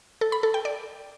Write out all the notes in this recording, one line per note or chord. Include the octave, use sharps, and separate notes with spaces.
A4
B5
A4
G5
D5